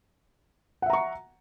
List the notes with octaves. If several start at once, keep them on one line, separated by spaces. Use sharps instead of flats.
E5 F#5 A#5 C#6